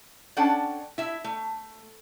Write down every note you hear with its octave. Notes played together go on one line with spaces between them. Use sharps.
C#4 D4 A4 F#5 G5
E4 E5
A3